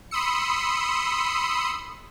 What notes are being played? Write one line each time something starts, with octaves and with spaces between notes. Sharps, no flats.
B5 C6 D#6 E6 C#7